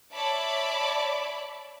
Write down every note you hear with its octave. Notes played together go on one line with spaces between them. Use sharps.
C#5 D5 E5 A5 B5 D6